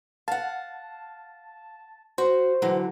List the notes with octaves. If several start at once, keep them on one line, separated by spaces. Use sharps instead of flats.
F5 F#5 A5
F#4 C5
D3 E3 F#3